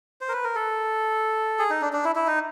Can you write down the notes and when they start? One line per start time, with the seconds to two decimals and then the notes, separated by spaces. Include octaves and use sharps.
0.21 C5
0.29 A#4
0.33 B4
0.44 A#4
0.55 A4
1.59 G#4
1.70 D#4
1.82 D4
1.93 D4
2.05 E4
2.16 E4
2.27 D#4